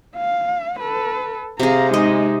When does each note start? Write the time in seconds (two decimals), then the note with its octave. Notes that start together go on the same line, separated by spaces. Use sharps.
0.16 F5
0.80 A4 B4
1.60 C3 G#4 F5 A#5
1.94 G#3 D#4 D#5